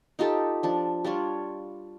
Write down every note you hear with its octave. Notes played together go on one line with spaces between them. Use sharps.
D#4 F4 G4 A4
F3 D4
G3 D4 F4 C#5